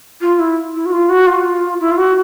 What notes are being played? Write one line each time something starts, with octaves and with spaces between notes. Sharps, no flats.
F4
E4
E4
F#4
F4
F#4
F4
E4
F4
F#4